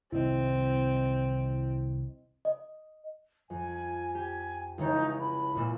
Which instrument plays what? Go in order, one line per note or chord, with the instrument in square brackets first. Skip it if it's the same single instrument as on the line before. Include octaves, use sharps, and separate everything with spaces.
[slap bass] C2 D#3 [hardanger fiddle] C4 [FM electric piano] E4 D#5
[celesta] D#5
[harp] F2 [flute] G#5
[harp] G4 [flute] G#5
[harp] C#2 E3 C#5 [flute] D#4
[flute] B5
[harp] C#2 A#2 E6